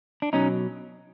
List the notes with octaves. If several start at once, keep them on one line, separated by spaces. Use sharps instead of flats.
D4
B2 F#3 C#4 D#4